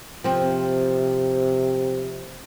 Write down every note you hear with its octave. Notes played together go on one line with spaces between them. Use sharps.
C3 F3 C4